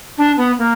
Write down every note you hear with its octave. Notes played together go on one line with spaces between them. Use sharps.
D4
B3
A#3